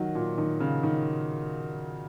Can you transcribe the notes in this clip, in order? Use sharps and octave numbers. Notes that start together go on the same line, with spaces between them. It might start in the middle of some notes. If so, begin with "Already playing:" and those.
Already playing: D#3 F#3
A#2
D#3
C#3
D#3